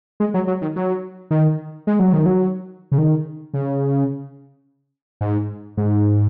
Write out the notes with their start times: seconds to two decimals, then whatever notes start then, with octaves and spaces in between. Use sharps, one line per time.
0.20 G#3
0.34 F#3
0.47 F#3
0.62 D#3
0.76 F#3
1.31 D#3
1.87 G#3
1.99 F#3
2.13 D#3
2.26 F#3
2.92 C#3
2.98 D#3
3.54 C#3
5.21 G#2
5.77 G#2